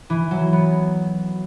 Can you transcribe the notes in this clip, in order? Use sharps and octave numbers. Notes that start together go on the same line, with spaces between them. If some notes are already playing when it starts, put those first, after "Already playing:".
E3
F#3
B3